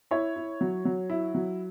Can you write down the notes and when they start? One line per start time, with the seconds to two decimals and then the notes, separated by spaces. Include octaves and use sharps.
0.11 E4 C#5
0.36 E4
0.61 F#3
0.85 F#3
1.10 E4
1.34 F#3